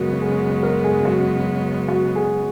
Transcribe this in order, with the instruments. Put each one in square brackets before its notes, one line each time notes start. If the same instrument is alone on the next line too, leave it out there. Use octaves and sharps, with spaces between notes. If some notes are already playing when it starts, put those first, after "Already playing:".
Already playing: [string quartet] F#2 C#3 G#3 B3 [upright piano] F#4 A#4
[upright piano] G#4
A#4
G#4
F#4
F#4
G#4